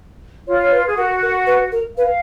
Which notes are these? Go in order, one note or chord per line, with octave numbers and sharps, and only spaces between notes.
F4 C#5
C#5
B4
G#4
F#4 A#4
A#4
B4
A#4
B4 F5